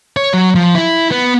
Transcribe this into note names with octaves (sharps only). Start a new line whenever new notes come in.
C#5
F#3
F3
E4
B3